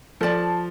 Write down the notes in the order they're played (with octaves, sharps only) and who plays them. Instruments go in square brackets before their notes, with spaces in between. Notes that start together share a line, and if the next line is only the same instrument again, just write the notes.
[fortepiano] F3 [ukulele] A4 D5 A5